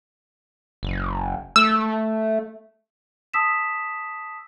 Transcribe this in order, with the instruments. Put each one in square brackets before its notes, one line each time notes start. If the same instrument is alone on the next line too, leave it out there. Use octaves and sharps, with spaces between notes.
[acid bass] F#1
[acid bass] A3 [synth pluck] E6
[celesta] A5 D#6 E6 B6 E7